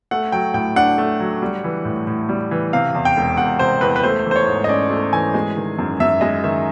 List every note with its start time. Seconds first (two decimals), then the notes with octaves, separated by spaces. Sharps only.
0.11 A3 F#5
0.32 F#3 G5
0.54 A2 G5
0.76 D4 F#5
0.98 A3
1.20 F#3
1.42 G3
1.64 E3
1.85 A2
2.07 A2
2.29 G3
2.51 E3
2.73 C3 F5
2.95 E2
3.05 G5
3.17 E1
3.37 E1 F#5
3.59 C3 C5
3.81 E2 B4
3.96 B4
4.03 A3 C5
4.26 E3
4.31 C5
4.36 C#5
4.47 G#2
4.64 D#5
4.69 C#4 D5
4.91 A3
5.13 E3 G#5
5.34 G#3
5.57 D#3
5.78 F#2
6.00 F#2 E5
6.21 G#3 D#5
6.44 D#3 E5